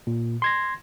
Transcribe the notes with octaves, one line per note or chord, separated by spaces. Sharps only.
A#2
C6 G#6 A#6